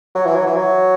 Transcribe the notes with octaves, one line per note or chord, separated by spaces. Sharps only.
F#3
E3
F#3
E3
F#3